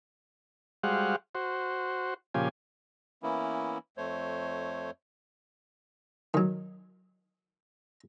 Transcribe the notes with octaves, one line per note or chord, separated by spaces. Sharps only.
G3 G#3 F#4 C5 F5 F#5
F#4 C5
A#2 C#3 F3 G4 G#5
E3 A#3 B3 C#4 E4
F2 A3 C5 C#5
D#3 F#3